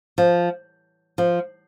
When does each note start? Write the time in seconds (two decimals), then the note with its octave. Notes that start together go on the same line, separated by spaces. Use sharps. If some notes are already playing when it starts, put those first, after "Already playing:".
0.18 F3
1.18 F3